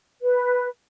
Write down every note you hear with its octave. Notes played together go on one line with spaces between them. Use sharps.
B4